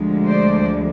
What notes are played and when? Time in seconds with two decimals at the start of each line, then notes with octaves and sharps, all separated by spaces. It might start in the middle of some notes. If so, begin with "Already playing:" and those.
Already playing: D2 D3 F3 G#3
0.25 C5 D5